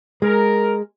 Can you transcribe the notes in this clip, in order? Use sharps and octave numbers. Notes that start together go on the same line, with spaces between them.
G#3 A#4